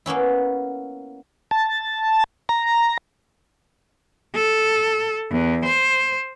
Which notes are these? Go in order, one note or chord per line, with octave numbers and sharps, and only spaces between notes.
A#3 B3 C#4 E4
A5
A#5
A4
E2
C5